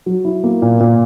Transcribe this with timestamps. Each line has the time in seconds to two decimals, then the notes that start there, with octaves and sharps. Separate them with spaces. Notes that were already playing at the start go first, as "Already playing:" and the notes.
0.06 F#3
0.25 E4
0.44 A#3
0.62 A#2
0.80 A#2